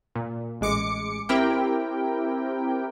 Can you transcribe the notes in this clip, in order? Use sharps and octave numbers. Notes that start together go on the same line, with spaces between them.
A#2
A1 G#3 D6 C#7
C4 E4 G4 A#4 G5